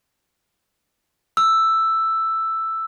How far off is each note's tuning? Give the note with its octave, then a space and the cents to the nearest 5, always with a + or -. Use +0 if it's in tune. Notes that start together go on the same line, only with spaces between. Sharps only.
E6 +5